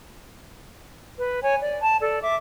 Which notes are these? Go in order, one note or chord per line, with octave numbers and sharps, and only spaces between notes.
B4
C#5 G#5
D5
A5
A4 D5
E5 D6